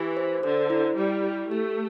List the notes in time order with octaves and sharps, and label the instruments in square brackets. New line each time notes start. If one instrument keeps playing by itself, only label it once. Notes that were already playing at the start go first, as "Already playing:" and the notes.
Already playing: [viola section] E3 [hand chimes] G4
[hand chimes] C5
[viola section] D3 [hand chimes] C5
[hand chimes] E4
[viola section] G3 [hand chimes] E4
[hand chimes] G4
[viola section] A3 [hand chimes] G4